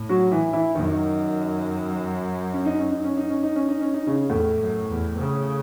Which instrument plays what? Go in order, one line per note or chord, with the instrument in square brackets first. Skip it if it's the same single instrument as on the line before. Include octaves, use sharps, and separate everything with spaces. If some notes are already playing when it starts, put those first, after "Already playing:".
Already playing: [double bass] A2
[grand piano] F#3 F#4
E3 E4
E3 E4
[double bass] F#2 [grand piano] D#3 D#4
[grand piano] C#4
D#4
C#4
D#4
C#4
D#4
C#4
D#4
C#4
D#4
C#4
D#4
C#3 C#4
[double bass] E2 [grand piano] A2 A3
[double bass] F#2
E2
C#3